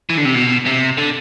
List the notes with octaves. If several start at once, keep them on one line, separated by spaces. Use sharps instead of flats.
E3
D3
C3
B2
C3
D3